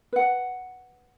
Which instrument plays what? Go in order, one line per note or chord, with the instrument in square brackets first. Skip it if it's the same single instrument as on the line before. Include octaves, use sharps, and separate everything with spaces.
[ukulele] B4 F#5